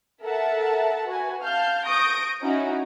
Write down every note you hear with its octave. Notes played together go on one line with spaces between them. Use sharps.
A4 A#4 E5 F#5 A5
F#4 B4 G#5
F5 A5 F6 G6
C#6 D#6 G6 A#6 D7
C#4 D#4 E4 F#4